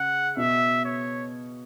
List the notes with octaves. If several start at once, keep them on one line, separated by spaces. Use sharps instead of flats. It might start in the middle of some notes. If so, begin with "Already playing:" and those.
Already playing: C#3 F#5
B2 E5
C#5